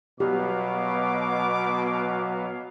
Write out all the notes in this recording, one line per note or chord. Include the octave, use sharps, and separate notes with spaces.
B2 F#3 B3 G4 F5 D6